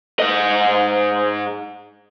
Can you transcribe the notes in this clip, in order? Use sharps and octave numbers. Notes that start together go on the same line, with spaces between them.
G#2 D#5